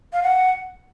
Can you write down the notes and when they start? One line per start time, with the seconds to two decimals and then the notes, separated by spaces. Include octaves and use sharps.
0.13 F5
0.23 F#5